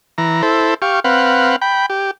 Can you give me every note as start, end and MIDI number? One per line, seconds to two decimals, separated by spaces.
0.18 0.42 52
0.18 0.42 82
0.42 0.74 64
0.42 0.74 69
0.42 0.74 72
0.82 1.00 67
0.82 1.00 77
0.82 1.00 85
1.04 1.56 60
1.04 1.56 71
1.04 1.56 77
1.04 1.56 78
1.61 1.86 79
1.61 1.86 83
1.90 2.11 67